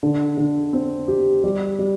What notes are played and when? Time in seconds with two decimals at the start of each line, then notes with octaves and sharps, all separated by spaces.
0.03 D3
0.37 D3
0.73 C4
1.08 G4
1.44 G3
1.79 G3